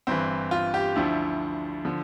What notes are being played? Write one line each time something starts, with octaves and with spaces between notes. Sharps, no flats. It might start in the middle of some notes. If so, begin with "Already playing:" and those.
G1 G2 E3 C4
F4
G4
D2 D3 F3 E4
D3 F3